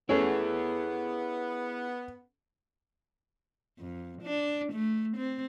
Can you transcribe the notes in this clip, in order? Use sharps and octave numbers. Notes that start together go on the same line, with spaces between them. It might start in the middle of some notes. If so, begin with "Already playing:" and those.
A3 B3 C#4 E4 G#4 C#5
F2
D4
A3
C4